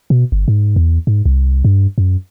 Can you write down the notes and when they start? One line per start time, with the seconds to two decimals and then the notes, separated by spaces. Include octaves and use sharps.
0.10 B2
0.32 G1
0.48 G#2
0.76 E2
1.07 G#2
1.26 C2
1.65 G2
1.98 F#2